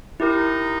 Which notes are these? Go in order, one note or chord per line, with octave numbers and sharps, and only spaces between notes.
D#4 E4 G4 A#4